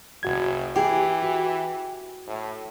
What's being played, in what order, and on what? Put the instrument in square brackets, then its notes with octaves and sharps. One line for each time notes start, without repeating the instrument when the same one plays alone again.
[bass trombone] F#1 [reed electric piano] C2 F#4 G#6
[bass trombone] E3 [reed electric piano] E4 [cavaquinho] G4 G#4
[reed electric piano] F#4
[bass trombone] A2